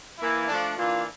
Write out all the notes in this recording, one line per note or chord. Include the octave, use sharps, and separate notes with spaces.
E3 A#3 E4
F3 A3 D4
E3 A#3 D4 F4